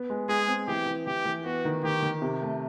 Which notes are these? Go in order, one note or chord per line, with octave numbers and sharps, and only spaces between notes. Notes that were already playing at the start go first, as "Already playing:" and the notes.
Already playing: B3
G#3
G#3 G#4
C4
E3 G4
E3
E3 G4
E3
B3 F#4
D#3
D#3 G4
D#3
C3
A3